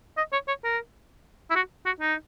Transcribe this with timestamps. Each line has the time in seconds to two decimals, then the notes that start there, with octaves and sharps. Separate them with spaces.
0.17 D#5
0.32 C#5
0.48 C#5
0.64 A#4
1.50 E4
1.55 F#4
1.86 F#4
2.00 D#4